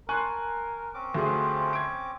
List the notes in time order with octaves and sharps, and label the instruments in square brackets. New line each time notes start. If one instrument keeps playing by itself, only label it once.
[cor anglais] A#4 [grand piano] G#5 F#6 [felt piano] A5 C6 C#6
[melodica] C4 C#4 D6
[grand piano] D2 [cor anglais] F3 [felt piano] A3 F#4 G#4
[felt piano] G#6 D7